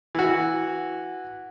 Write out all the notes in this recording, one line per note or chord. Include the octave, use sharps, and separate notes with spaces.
E3 F#4